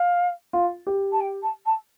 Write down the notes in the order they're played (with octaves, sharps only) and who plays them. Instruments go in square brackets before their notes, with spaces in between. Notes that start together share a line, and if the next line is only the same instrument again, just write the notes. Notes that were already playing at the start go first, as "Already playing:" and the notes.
Already playing: [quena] F5
[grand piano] F4
G4
[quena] A5
G5
A5
A5